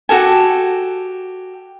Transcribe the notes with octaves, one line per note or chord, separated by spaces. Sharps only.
F#4 G4 A4 G#5